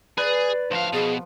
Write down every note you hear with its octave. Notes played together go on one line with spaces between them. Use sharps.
G#4 B4 D5
D2 F3 F5
B2 G#4